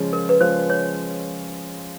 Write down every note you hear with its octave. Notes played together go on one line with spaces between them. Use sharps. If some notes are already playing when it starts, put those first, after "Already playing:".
Already playing: C#3 F3 G#3 C#4 F4
A#4
B4
C#3 F3 G#3 C#4 F4 C5
C#5